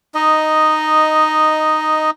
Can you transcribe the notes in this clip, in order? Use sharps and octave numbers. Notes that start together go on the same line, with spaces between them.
D#4 D#5